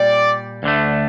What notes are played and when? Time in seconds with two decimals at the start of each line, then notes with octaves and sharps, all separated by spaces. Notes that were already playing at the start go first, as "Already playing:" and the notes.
Already playing: A#2 G3 D5
0.63 D2 D3 A3